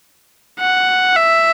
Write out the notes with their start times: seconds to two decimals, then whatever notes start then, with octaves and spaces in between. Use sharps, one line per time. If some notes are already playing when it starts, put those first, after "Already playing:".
0.60 F#5
1.16 E5